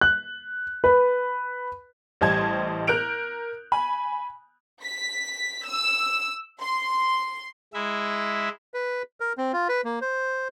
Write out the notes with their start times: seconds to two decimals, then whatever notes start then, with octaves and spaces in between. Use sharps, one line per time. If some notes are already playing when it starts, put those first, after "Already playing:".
0.01 F#6
0.84 B4
2.21 A1 G3 C5 D#5 A5 G#6
2.87 A#4 F#6 G6 D7 F7
3.72 G#5 B5
4.82 B6
5.67 E6
6.61 C6
7.74 G#3 E4 E5
8.74 B4
9.20 A#4
9.38 C4
9.53 F4
9.69 B4
9.84 A#3
10.01 C5